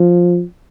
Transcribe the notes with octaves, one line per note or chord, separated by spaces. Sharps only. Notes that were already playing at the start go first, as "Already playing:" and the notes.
Already playing: F3